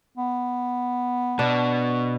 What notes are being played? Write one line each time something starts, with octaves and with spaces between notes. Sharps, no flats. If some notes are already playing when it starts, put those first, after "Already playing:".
B3
B2 D4